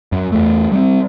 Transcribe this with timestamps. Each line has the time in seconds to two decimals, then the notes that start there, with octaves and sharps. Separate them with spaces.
0.12 F#2
0.32 E2 A3
0.72 G3 G#3 C4